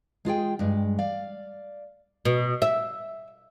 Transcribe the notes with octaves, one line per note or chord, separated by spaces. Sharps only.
G#3 F4 G#4 G5
G2 G#3
D5 F5
B2
E5